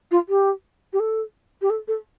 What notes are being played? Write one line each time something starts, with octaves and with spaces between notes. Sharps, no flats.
F4
G4
G4
A4
G4
A4
A4